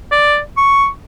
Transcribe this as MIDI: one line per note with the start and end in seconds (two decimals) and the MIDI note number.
0.11 0.39 74
0.57 0.88 85